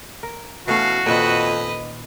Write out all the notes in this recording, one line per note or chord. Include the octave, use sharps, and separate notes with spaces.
A#4
B2 E3 A3 C#4 F#4 F5
F2 A#2 D#3 B4 D#5